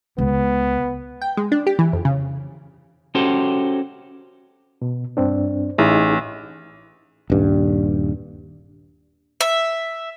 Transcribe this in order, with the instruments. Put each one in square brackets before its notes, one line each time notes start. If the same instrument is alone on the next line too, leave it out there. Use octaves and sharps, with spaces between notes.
[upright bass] C#2 [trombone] B3
[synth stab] G5
G#3
D4
G4
E3
F2
C#3
[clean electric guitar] C#4 F#4 G4 A4 C5
[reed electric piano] B2
G2 C4 D4
[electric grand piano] A1 [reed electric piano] D#4 E4 G#4
[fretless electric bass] D#1 G2
[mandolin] E5